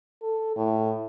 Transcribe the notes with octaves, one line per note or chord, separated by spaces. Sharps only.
A4
A2